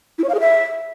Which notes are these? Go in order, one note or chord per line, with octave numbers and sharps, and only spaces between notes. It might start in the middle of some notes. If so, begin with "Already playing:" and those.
E4
C#5
F5
G#4
E5